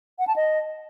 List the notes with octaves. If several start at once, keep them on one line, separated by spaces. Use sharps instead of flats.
F#5
A5
D#5